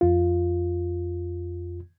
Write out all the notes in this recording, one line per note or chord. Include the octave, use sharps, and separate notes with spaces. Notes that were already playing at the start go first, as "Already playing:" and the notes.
F2 F4